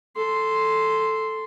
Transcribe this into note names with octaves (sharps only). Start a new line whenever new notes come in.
A4 C6